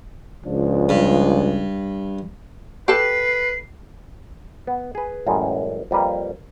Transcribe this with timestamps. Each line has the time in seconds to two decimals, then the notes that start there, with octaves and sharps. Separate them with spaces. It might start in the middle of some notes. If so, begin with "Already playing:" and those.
0.46 C#2 F3 D4
0.89 G2
2.88 G4 A4 B4 C7
4.67 B3
4.95 G#4 B4
5.27 A1 F#2 E3 G3 G#3
5.91 F2 G3 A#3 B4